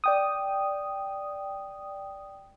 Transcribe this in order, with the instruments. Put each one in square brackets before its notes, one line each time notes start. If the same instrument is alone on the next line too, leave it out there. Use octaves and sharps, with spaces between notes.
[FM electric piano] D5 G5 D#6